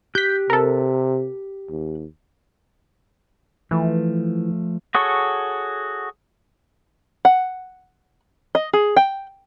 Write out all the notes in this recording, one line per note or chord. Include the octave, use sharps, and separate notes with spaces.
G4 F#6 G6 B6
C3 A4 A#4
D#2
E3 F3 A3
F#4 G#4 A4 C#5 C#6
F#5
D#5
G#4
G5